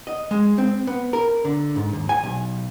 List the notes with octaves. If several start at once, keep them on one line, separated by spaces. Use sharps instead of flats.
D#5
G#3
C4
B3
A#4
D3
G#2
D#2
G#5
B1